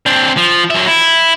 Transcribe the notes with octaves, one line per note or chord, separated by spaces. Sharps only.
C4 D4
F3
F#3 E5
E4